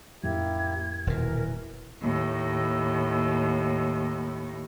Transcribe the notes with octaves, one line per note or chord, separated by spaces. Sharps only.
F2 A2 F#3 A#3 E4 G4 G#6
D#1 B2 E3 A#4
D#2 A2